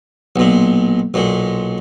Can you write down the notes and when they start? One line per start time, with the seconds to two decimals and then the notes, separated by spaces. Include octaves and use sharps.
0.36 B1 A#2
1.14 B1 A#2